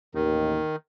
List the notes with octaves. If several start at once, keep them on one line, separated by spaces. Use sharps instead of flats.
A1 D#2 D#3